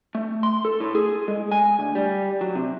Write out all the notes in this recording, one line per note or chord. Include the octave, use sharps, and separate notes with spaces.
A3
C6
A4
A2
G#4
G#3
G#5
D2
G3
F#3
C3